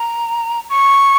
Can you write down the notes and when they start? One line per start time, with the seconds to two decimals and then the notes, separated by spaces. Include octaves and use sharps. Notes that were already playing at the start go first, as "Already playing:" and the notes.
Already playing: A#5
0.70 C#6